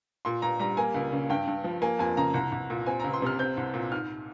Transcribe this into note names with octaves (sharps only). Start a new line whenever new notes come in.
A#2 C6
A#2 A#5
G3 A#5
A#3 G#5
C#2
C#3
G2 G5
G2
F3
A#3 G#5
F2 G#5
C#3 A#5
C2 A#5
C2
A#2
C4 G#5
A#5
C#2
C6
C3 F6
C4 G6
C2
A#2
G#2 F6